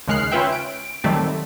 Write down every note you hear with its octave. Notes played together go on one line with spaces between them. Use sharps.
D#2 C#3 G#3 F6 F#6 C7
C#4 F4 B4 E5 G5
D7
D#3 F#3 G3 A3 C4